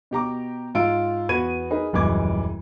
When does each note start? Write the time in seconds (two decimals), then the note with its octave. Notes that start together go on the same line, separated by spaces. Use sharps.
0.11 B2 G4 A#5 D6
0.75 G#2 F4 E6 D7
1.29 E2 B3 F#4 B4 G#6 D#7
1.71 D#4 G#4 A#4 B4
1.93 D#1 F#2 E3 G#3 D6 G#6